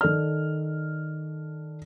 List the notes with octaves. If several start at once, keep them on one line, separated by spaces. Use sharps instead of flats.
D#3 A4 D5 F6